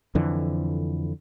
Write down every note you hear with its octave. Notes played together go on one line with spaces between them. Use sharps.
F2 D3 E3